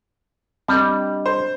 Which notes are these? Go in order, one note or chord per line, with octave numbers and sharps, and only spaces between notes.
G3 C4 D4 D#5
C5